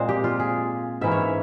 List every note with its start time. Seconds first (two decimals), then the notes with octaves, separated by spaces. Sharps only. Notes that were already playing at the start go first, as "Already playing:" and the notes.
Already playing: A#2 G#3 C4 C5
0.09 G4
0.24 F4
0.40 G#4
1.01 G#2 E3 A#3 C#4 E5
1.12 C#5